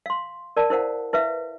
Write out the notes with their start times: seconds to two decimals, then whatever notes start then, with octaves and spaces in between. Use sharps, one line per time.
0.06 F5 C6
0.57 A#4 D5 A5
0.70 E4 A#4 C5 F5 F#5
1.13 E4 B4 E5 F5